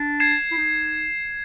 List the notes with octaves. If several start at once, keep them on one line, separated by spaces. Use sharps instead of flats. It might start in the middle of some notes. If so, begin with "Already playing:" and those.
Already playing: D4
G#6 C7 E7
E4
D#4